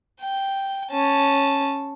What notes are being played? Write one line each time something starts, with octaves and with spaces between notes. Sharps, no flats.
G5
C#4 A5